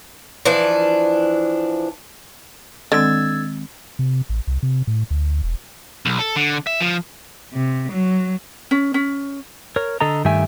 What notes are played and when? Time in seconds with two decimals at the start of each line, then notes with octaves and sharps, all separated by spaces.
0.45 E3 F3 D4
2.92 D3 D#3 G#3 C4 E6 G#6 A6
3.99 C3
4.29 A1
4.47 C2
4.63 C3
4.87 A2
5.11 D2
5.43 E1
6.06 B1
6.19 A4
6.36 D3
6.67 E5
6.81 F3
7.53 C3
7.92 F#3
8.71 C#4
8.94 C#4
9.76 A#4 C#5
10.01 D3 A4 D#5 A#5
10.24 G2 D#3 A3 G4 E5 G#5